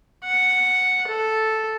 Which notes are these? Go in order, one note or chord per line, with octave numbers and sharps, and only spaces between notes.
F#5
A4